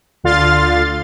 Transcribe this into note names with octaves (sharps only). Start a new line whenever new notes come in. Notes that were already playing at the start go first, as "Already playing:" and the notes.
D2 D3 F4 F5 C6 A6